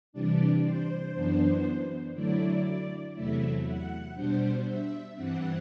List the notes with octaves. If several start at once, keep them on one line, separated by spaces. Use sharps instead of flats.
C3 E3 G3 D4 D5
C5
F#2 E3 B3 D4
D3 F#3 A3 E4 D5
E2 C3 F#3 A3 E4 E5
F#5
B2 G3 D4 C5
E5
G2 E3 G3 C4 F#5